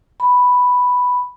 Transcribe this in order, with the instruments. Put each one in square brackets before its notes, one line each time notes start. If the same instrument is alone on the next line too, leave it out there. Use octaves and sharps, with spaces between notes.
[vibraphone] B5